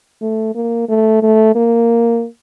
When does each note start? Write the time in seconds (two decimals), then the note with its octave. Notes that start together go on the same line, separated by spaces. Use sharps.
0.22 A3
0.55 A#3
0.89 A3
1.22 A3
1.55 A#3